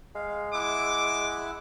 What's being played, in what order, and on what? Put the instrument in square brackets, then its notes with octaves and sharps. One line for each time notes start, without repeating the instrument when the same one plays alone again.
[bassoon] G#3 [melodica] F5
[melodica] E4 E5 F#5 [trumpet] D6